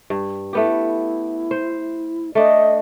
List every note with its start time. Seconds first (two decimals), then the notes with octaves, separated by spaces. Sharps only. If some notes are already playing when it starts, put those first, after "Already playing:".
0.10 G2
0.53 A3 B3 E4 G4
1.51 C5
2.35 A3 D4 D#5